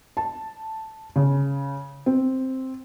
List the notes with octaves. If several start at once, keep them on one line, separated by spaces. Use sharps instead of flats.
A5
C#3
C4